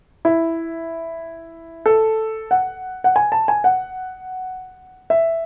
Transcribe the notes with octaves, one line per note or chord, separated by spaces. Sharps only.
E4
A4
F#5
F#5
G#5
A5
G#5
F#5
E5